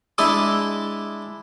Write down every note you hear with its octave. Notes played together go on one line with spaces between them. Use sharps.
G#3 D4 E4 D#5 D#6